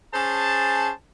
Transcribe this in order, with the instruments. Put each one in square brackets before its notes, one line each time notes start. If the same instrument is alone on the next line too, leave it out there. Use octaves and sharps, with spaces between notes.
[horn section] C#4 G#4 C5 A5